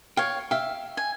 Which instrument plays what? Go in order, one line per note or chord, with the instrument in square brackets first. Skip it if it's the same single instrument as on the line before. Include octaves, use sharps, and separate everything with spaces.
[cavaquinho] C#5 F5 [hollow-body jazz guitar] G5
[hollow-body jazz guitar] E5 G5 [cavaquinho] F5
[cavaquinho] G#5